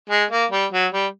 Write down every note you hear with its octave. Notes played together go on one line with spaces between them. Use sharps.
G#3
A#3
G3
F#3
G3